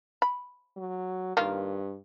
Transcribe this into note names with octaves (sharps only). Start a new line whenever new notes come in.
B5
F#3
G2 D#3 A#3 F4